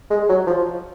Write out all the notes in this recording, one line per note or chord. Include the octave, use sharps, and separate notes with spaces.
G#3
F#3
F3